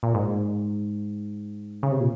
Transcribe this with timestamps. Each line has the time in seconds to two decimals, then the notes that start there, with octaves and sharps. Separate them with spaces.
0.03 A#2
0.14 G#2
1.83 C#3
1.91 C3
2.00 A#2